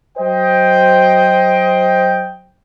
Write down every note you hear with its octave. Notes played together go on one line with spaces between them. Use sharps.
F#3 C5 D#5 G5